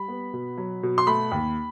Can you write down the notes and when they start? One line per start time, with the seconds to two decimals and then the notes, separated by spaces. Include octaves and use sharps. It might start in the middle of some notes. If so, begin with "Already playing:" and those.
Already playing: G3 B5
0.08 B3
0.33 B2
0.58 F#3
0.83 B2
0.98 C6
1.07 A3 B5
1.32 D#2